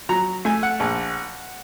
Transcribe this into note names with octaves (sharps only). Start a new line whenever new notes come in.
F#3 A#5
A3 G#5
F#5
A#1